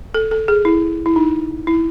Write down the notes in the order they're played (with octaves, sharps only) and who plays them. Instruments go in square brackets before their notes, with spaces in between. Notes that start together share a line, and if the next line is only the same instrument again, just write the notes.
[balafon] A4
A4
G#4
E4
E4
D#4
E4